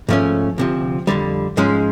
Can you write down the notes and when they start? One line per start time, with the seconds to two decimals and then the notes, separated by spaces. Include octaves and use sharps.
0.09 G#2 F3 A3 C#4
0.58 D2 C3 F3
1.07 F2 D3 G3
1.57 G#2 F3 G#3 C#4